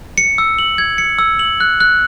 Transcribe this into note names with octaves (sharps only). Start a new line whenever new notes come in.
C#7
E6
F#7
G#6
C#7
E6
F#7
F#6
F#6